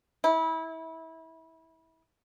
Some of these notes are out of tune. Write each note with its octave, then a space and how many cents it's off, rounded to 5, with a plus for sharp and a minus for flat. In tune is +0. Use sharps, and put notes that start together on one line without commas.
E4 -25